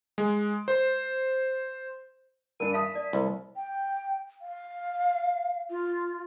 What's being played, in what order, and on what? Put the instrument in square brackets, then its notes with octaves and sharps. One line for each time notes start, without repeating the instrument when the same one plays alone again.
[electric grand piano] G#3
C5
[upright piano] G2 D4 [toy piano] A#4 G#5 [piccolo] D#7
[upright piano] E5 A5 D#6 [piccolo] B6
[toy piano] D5
[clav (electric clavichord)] C2
[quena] G5
F5
F4